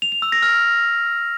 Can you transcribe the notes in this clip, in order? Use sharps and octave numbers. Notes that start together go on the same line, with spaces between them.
F7
F7
E6
A#6
F6